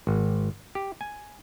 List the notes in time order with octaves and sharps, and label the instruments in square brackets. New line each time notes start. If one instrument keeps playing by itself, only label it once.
[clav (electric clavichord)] G#1
G4
G#5